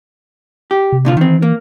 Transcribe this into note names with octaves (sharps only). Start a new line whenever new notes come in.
G4
C3
A#2 D3 F4
D#3 E3 C4
A#3